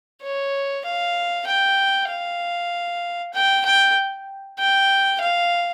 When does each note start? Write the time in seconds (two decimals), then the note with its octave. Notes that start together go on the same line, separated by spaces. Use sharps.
0.23 C#5
0.85 F5
1.47 G5
2.10 F5
3.34 G5
3.65 G5
4.59 G5
5.21 F5